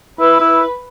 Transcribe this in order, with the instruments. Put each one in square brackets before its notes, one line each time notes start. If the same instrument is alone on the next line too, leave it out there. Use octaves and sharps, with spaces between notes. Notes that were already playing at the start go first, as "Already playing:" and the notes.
[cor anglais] E4 [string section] B4
[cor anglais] E4